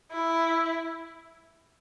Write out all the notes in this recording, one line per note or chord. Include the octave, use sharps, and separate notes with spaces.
E4